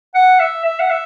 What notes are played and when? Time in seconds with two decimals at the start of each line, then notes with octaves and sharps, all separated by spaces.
0.15 F#5
0.40 E5
0.65 E5
0.80 F#5
0.91 E5